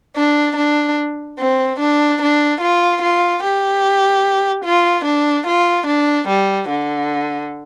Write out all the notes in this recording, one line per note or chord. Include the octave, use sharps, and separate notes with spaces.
D4
D4
C4
D4
D4
F4
F4
G4
F4
D4
F4
D4
G3
D3